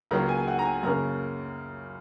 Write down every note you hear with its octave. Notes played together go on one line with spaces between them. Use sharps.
C#2 C#3 F#3 A#3 A#5
G#5
F#5
A#5
G#5
F#2 C#3 A#3 C#4 A#5